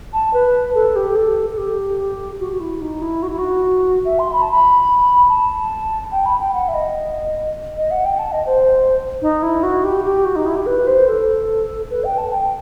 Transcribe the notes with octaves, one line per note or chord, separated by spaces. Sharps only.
A5
B4
A4
G4
A4
A4
G4
F#4
F#4
E4
D#4
E4
F#4
E4
F#4
E5
C6
B5
A5
B5
A5
G5
B5
G5
F#5
E5
D#5
D#5
F#5
G5
A5
D#5
C5
D#4
E4
F#4
G4
G4
F#4
D#4
E4
G4
B4
C5
A4
B4
G5
A5
G5